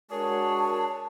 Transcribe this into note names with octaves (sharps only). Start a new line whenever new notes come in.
G#3 D4 F#4 G#4 A#4 C#5 A5